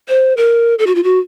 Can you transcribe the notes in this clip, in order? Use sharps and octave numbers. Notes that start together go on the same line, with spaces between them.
C5
A#4
A4
F#4
F4
F#4